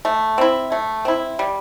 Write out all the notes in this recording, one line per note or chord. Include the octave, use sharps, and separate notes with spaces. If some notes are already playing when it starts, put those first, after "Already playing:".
A3
C4 E4
A3
C4 E4
G3